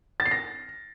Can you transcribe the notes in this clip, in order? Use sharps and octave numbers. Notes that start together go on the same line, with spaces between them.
A6
C7
A#6